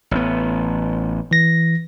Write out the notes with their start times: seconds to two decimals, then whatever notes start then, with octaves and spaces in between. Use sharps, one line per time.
0.11 A1 B3
1.31 E3 A#6